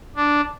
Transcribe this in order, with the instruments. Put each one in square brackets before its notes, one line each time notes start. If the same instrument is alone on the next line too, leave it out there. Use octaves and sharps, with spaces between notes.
[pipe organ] D4